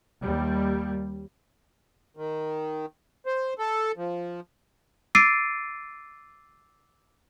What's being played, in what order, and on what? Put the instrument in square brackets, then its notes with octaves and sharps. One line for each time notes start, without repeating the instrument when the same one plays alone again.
[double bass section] D#2 G3 A#3
[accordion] D#3
C5
A4
F3
[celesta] D6 E6 A6 C7 D7 D#7